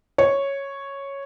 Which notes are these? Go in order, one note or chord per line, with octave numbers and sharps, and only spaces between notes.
C#5